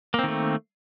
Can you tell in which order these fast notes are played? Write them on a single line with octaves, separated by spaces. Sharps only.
A#3 C4 D#3 A3